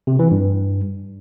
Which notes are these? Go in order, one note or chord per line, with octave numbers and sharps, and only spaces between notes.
C3
E3
G2